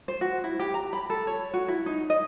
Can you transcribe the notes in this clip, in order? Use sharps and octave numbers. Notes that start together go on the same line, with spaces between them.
C5
F#4
E4
G4
A#5
B5
A4
C#5
F#4
E4
D#4
D#5